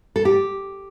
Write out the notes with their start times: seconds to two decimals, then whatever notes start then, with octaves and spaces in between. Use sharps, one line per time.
0.16 A4
0.25 G4